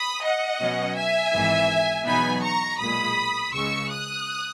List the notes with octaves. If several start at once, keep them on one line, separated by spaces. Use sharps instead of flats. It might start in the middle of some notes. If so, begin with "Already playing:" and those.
Already playing: B5 D#6
D#5 F#5
B2 F#3 C#4
E5 G#5
G#1 G#2 E3
E2 B2 F#3 B3 D#4 G#5 B5
A#5 C#6
B1 A#2 G#3 B5 D#6
C#2 C#3 G#3 C#6 E6
D#6 F#6